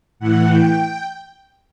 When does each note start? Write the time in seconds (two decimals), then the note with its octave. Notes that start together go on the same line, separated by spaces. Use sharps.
0.20 A2 E3 F#5
0.48 G5